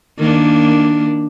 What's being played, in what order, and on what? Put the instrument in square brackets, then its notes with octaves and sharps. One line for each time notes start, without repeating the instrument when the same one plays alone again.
[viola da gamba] D#3 A#3 D4